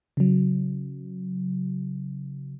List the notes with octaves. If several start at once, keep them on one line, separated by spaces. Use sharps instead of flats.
C#3 F#3